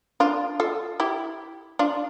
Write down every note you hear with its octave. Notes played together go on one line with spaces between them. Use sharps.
D4 F4
F4 A4
E4 G4
D4 F4